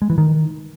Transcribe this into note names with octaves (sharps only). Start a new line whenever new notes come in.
G#3
E3
D#3